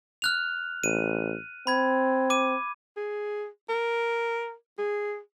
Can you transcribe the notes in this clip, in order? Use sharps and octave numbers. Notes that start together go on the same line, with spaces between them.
F6 F#6 F7
A1 D#7
C4 B5 G#6
D6 D#7
G#4
A#4
G#4